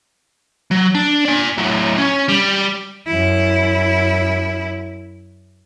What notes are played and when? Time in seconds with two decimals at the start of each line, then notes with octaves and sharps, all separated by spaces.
0.71 F#3
0.95 D4
1.25 D5 G#5
1.58 A2 F#3
1.98 C#4
2.28 G3
3.07 F#2 E4